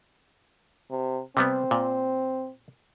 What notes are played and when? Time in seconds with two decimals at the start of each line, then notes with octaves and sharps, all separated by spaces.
0.91 C3
1.37 C3 G3 B3 C4
1.71 A#2